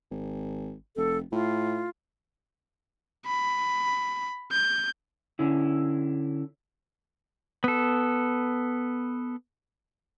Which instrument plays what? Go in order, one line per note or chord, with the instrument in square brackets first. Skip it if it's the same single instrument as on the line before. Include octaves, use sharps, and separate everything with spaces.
[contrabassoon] G#1
[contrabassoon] F1 [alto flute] A4
[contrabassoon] A2 [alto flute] F4
[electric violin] B5
G6
[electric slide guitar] D3 C#4 E4
[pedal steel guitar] B3 A4